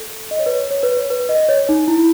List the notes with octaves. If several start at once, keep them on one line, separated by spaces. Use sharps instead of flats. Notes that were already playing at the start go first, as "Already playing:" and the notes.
Already playing: A4
D#5
C#5
B4
C#5
C#5
B4
C#5
B4
D#5
C#5
D#4
E4